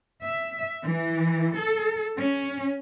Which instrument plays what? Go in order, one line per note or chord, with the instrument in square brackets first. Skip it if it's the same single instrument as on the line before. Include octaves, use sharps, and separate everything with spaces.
[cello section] E5
E3
A4
C#4